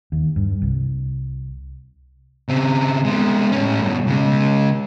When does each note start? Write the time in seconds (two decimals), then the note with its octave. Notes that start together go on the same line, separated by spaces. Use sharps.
0.12 D#2
0.36 G2
0.62 C2
2.49 C#3 C4
3.05 G#3 B3
3.52 A2 C#4
3.81 G2 B2
4.07 C#3 G#3